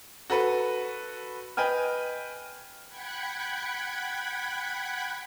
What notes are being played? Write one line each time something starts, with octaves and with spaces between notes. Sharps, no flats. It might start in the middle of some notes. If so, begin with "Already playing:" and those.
F#4 A4 B4
B4 D#5 G5 G#5 F6
F#5 G5 B5 F#6 G#6